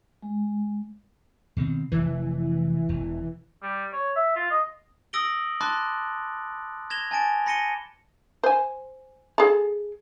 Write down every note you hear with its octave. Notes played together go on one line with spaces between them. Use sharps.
G#3
B2 D#3 C4
F1 E3
E1
G3
C#5
E5
F4
D#5
D#6 E6 A#6 D7 F#7 G7
A5 B5 C6 D6 F#6 A6
G#6 A#6 E7 F7 G7
G#5 A5 A6 D7
B5 A#6 C#7 D#7 G7
C5 G#5
G#4 A4